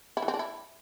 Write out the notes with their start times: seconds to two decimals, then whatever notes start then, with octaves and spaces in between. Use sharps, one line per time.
0.17 E4
0.22 E3
0.28 C4
0.34 D4
0.39 E4